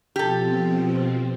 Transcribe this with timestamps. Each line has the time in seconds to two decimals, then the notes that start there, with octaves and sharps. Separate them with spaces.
0.16 B2 F3 C4 G4 A4